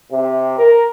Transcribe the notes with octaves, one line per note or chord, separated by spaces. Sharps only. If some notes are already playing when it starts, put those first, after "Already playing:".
C3
A#4